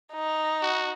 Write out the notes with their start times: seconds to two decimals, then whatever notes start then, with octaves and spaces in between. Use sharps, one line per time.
0.13 D#4
0.63 F#4